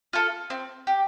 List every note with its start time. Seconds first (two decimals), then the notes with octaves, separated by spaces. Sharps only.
0.13 F4 A4
0.50 C4
0.87 G4